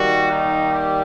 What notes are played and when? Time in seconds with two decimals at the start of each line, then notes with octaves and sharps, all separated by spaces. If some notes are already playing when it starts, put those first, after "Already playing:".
Already playing: D#3 G3 A#3 F#4
0.32 D#4
0.73 G4